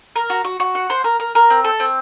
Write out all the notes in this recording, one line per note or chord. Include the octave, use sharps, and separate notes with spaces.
A#4
F#4
F#4
F#4
F#5
C5
A#4
A#4
A#4
C4
A4
C4